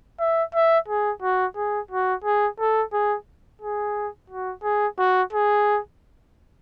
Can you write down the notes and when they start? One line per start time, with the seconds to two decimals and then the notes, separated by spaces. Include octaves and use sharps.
0.20 E5
0.54 E5
0.88 G#4
1.22 F#4
1.56 G#4
1.91 F#4
2.24 G#4
2.60 A4
2.93 G#4
3.61 G#4
4.30 F#4
4.63 G#4
4.98 F#4
5.33 G#4